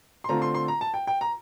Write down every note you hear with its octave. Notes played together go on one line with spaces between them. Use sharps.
C6
D3 A3 C4 F4 A#5
C6
C6
A#5
A5
G5
G5
A#5